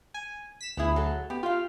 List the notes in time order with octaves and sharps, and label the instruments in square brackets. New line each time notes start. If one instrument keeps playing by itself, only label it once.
[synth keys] G#5
B6 E7
[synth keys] D2 G#4 [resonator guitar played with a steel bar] B3 E4
[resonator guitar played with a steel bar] F#3 A4
[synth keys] B3 [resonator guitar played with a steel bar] G4
[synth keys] F4 [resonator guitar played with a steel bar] G4 F5